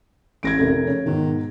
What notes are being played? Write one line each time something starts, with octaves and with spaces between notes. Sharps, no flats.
A1 G#6 A#6 D7
F1 C3 A#4
C#3 C#5
G#2 B2 D#3